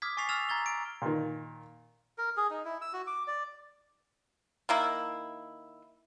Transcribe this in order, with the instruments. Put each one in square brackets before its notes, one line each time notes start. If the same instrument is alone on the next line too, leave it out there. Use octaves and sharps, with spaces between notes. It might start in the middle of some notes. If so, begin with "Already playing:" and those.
[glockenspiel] D6 D#6 F6 G#6 B6
G#5 C#6 A6 B6 C7 F7
E6 F6 G#6 A6 E7 F7
A#5 G#6 A6 G7
D7
[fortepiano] A#2 D#3
[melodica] A#4
G#4
D#4
E4
E6
F#4
D6
D5
[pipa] D#3 A#3 E4